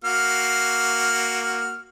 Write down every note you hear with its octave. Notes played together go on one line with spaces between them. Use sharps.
A#3 F#4 F6